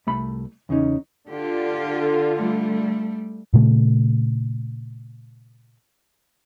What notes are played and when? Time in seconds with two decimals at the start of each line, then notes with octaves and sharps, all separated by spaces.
0.07 C2 A3 B5
0.69 E2 C#3 C#4 D#4
1.29 D3 F4 G4
2.36 G3 A3
3.54 A#2 C#3 A3